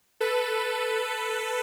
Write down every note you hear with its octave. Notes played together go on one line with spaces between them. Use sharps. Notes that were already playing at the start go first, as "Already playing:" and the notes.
A4 B4